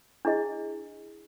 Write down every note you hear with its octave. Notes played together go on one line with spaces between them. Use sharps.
D4 E4 G#4 D#5